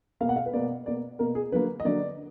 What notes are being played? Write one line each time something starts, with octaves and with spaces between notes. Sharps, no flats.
B2 A#3 F5
F#5
F5
B4
B2 A#3 D5
B2 A#3 D5
B2 A#3 A#4
G#4
D3 F#3 A#3 B4
D#5
D3 F#3 A#3 D5